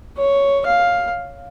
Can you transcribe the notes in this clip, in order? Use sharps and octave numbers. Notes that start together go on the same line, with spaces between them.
C#5
F5